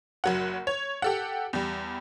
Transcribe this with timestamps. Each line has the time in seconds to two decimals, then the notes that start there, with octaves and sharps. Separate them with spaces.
0.24 F#1 F#3 F#5
0.67 C#5
1.02 G4 A4 F#5
1.53 E2 G3